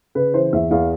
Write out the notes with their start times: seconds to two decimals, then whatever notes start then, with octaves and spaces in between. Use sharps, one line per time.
0.15 C#3 B4
0.34 E3 C5
0.53 E2 E5
0.71 E2 F5